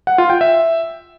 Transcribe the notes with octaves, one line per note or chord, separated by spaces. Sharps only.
F#5
F4
G5
E5